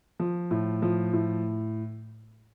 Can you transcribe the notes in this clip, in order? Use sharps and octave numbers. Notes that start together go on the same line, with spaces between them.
F3
A2
F3
A2